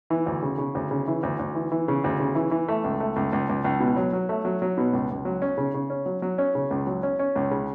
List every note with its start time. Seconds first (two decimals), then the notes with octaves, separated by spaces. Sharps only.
0.10 E3
0.26 D2
0.42 C#3
0.58 C#3
0.75 D2
0.91 C#3
1.08 E3
1.23 D2
1.39 D2
1.55 E3
1.72 E3
1.88 C#3
2.04 D2
2.20 C#3
2.35 E3
2.51 E3
2.68 A3
2.84 C#2
3.00 A3
3.16 C#2
3.33 C#2
3.49 C#2
3.64 C#2
3.80 B2
3.96 F#3
4.13 F#3
4.29 A3
4.45 F#3
4.62 F#3
4.77 B2
4.93 C#2
5.10 C#2
5.25 F#3
5.42 C#4
5.58 C#3
5.74 C#3
5.90 C#4
6.06 F#3
6.22 F#3
6.38 C#4
6.55 C#3
6.71 C#2
6.87 F#3
7.03 C#4
7.19 C#4
7.35 C#2
7.51 C#3